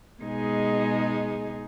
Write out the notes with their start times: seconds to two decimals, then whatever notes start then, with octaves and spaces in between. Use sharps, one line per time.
0.22 B2 G#3 D#4 G#4